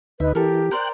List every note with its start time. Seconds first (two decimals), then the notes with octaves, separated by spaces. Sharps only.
0.20 D2 D#4 B4 E5
0.35 E3 G4 A4 A#4
0.71 A#4 C5 D5 G5 F#6